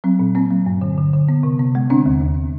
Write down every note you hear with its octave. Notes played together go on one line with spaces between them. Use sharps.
F#3 C4
A#2
A#3 C4
F#3
G2
D3
D3
D3
B3
C3
B3
G#3
D3 C4 D4
D#2
D#2